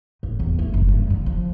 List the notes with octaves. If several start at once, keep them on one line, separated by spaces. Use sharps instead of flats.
D#3
E2
A3
F#1
G2
D3
F3